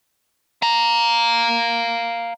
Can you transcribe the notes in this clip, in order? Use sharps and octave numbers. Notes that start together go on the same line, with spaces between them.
F5 A#5